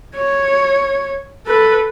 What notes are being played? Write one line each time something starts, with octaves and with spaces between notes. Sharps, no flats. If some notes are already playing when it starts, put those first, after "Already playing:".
C#5
A4 B4